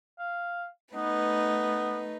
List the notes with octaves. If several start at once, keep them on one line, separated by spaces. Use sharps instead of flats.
F5
A3 B3 D#4 B4